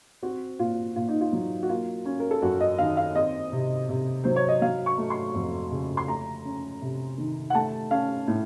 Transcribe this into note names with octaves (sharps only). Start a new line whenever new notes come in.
C4 F#4
A#2 F4
A#2 F4
D#4
F4
F#3
F#4
A#3 F4
C#4
A#4
A4
F#2 F#4
D#5
D#3 F5
F5
C4 D#5
C3
C3
F#3 C5
C#5
D#5
F#3 F5
C#6
A3
C6
F2
C#3
C6
A3 A#5
C#4
C3
D#3
F#5
A3 A5
C#4 F5
A2